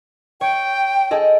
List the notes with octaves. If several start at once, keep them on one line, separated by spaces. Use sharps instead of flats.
C#5 G5
G#4 A4 D#5